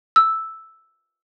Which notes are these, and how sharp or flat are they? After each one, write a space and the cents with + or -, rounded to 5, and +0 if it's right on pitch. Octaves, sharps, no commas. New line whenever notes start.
E6 +0